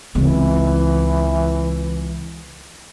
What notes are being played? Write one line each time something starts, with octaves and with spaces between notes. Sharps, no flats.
C#2 E3 C4